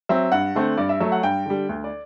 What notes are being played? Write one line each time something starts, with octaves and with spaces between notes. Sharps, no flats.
F#3 C4 E5
G2 F#5
D3 A3 C4
G2 D5
E5
F#3 A3 E5
F#5
G2 G5
D3 G3
D2
D5